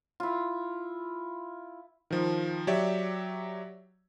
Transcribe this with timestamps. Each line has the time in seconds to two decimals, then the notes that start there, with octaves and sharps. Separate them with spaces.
0.20 E4 F4
2.11 D#3 F3
2.67 F#3 G4 C#5 D5 E5